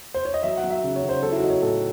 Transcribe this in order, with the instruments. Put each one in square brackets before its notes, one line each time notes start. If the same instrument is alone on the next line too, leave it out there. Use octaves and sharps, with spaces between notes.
[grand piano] C5
C#5
D#5
F#3 E5
F#5
F#3
E5
C#3
C#5
C#3
C5
F#3 A4
E4
F#4
F#3 D#5
C#5
A2 A4